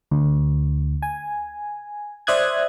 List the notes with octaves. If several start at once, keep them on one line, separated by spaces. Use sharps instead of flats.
D2
G#5
C5 D5 E5 D#6 F#6 G#6